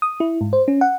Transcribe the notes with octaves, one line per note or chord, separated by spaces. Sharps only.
D#6
E4
G#2
C5
C#4
F#5